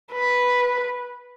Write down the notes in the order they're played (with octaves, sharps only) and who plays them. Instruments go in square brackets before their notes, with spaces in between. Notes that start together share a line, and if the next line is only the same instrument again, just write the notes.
[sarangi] B4